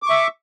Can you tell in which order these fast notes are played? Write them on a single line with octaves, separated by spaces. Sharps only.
D6 C#6 E5